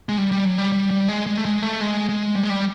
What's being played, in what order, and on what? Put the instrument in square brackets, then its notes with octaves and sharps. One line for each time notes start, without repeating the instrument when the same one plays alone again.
[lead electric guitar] G#3
G3
G3
F#3
G3
G3
G3
G#3
G#3
A3
G#3
A3
G#3
G#3
G3
G#3
G3